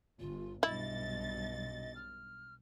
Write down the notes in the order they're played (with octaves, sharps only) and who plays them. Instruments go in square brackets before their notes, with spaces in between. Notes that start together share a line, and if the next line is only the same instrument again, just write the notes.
[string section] G1 [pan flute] F4
[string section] B1 G2 A6 [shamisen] E4 [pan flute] D#5
[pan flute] F6